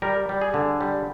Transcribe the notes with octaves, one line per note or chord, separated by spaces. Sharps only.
G3 A#4
G3
G#4
D3
G3